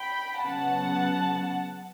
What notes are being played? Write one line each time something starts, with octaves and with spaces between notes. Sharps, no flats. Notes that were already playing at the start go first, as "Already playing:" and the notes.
Already playing: G5 B5
C#3 F#3 B3 F#5 A5